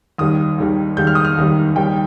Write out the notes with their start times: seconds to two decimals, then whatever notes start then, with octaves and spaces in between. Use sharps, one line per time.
0.18 D#2 D#3 G3 D#6
0.58 D#2 D#3 G3
0.97 D#2 D#3 G3 G6
1.07 F6
1.15 D#6
1.25 F6
1.37 D#2 D#3 G3
1.76 D#2 D#3 G3 G5